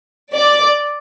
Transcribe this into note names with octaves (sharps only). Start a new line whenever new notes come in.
D5